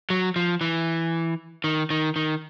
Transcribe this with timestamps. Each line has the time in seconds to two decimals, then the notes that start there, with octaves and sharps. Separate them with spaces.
0.10 F#3
0.36 F3
0.61 E3
1.64 D#3
1.90 D#3
2.16 D#3